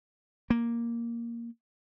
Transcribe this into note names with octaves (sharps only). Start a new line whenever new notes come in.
A#3